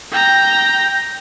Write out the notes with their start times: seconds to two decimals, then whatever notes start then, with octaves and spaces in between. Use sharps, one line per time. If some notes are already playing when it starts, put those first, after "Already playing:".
0.11 G5 A#5